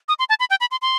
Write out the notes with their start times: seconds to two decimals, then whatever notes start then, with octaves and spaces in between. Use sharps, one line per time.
0.08 D#6
0.19 C6
0.29 A5
0.40 B5
0.50 G5
0.61 B5
0.71 C6
0.82 C6